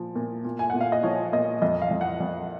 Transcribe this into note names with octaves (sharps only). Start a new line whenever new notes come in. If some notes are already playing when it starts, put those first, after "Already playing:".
Already playing: A#2 F3
A#2
A#2
G#5
A#2 F#5
F5
D#5
F3 C#5
A#2 D#5
F2 D#5
F5
F2
F#5
F2